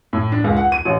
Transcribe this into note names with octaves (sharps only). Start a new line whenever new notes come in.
A2
D4
C#2
F#5
D#7
A1